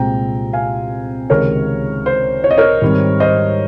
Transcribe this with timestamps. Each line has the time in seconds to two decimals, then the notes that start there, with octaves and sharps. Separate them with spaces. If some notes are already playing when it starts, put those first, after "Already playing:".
Already playing: C2 A#2 G#3 C4 G5 A#5
0.53 F5 G#5
1.30 C#2 C3 D#3 G#3 A#4 C#5
2.06 C5
2.44 C#5
2.51 D#5
2.57 A#4 C#5
2.81 G#2 D#3 G3 C4
3.20 C5 D#5